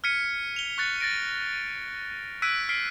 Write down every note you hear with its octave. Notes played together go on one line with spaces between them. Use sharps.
F6 G#6 B6 C#7 D#7
F7 G7
C#6 F#6 A6 C#7
A6 A#6 D7
E6 F#6 G#6 B6 D7 D#7
F6 B6 C7 D7